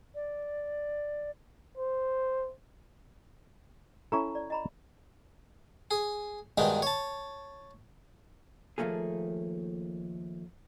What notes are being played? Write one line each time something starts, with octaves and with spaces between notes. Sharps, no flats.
D5
C5
C#4 E4 A4 A#5 C#6
D5
D#5 A#5 B5
G#4
G2 B2 D#3 G#3 D#4
C#5 A5
D#2 G#2 F3 A3 A#3 G#4